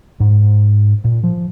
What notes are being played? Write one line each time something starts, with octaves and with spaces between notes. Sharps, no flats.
G#2
A#2
F3